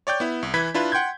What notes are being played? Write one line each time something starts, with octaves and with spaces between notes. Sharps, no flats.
C#5 D5 G5 G6
B3 E4
C2
E3 E4 B4 G#6 B6
D4 E4 F4 B4
F#5 G5 C6 G6 G#6